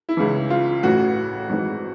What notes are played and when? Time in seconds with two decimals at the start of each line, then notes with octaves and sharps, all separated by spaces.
0.09 E4
0.17 C#2 C#3 E3
0.50 F4
0.83 A1 A2 E3 F#4
1.49 G#1 G#2 E3